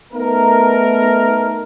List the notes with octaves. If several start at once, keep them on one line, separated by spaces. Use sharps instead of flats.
A3 B3 D#4 A#4